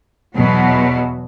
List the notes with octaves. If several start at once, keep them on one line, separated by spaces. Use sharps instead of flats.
E2 B2 F#3